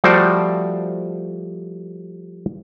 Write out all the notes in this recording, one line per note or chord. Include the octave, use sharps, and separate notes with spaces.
F3 G3 A3 F#4 C5 D5